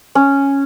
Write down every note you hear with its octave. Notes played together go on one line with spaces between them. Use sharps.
C#4